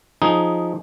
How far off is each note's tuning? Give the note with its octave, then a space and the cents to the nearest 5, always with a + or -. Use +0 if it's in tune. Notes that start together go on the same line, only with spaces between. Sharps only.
F3 +5 D#4 +0 G#4 +10